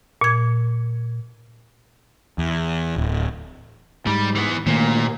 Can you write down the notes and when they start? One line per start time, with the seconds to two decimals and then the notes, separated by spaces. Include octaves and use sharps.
0.21 A#2 G#6
2.38 E2
2.96 D1
4.07 G#2 G3
4.35 E3 B3
4.66 A#2 D#3 A3 A#3